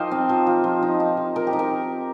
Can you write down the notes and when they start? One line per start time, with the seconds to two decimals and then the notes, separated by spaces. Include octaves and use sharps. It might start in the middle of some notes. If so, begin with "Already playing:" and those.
Already playing: F3 D#4 G4 A#4 C5 D#5 F5
0.11 C4
0.29 F3
0.47 F3
0.64 F3
0.83 D#4
1.00 D#4
1.17 F3
1.36 F3 A#4
1.47 G4
1.53 D#4
1.59 A#4